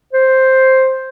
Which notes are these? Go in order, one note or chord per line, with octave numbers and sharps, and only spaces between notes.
C5